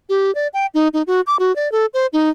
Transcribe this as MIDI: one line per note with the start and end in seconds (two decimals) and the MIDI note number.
0.09 0.33 67
0.35 0.48 74
0.54 0.66 79
0.74 0.88 63
0.94 1.02 63
1.07 1.21 66
1.27 1.37 86
1.39 1.54 66
1.56 1.71 74
1.72 1.86 69
1.94 2.07 72
2.13 2.30 63